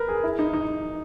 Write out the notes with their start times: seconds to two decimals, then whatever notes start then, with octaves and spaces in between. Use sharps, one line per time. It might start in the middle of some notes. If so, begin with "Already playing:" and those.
Already playing: A#4 B4
0.08 G#4
0.23 E4
0.39 D#4
0.54 D#4